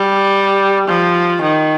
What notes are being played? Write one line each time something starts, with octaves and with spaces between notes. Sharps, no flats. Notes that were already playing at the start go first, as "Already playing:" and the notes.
Already playing: G3
F3
D#3